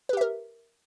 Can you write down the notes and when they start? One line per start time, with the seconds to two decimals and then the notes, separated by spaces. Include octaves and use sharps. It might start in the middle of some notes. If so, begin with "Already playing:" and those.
0.09 B4
0.13 G4
0.17 E5
0.21 A#4